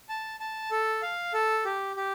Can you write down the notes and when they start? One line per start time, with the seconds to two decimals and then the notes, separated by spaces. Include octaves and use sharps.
0.09 A5
0.40 A5
0.71 A4
1.02 F5
1.33 A4
1.65 G4
1.96 G4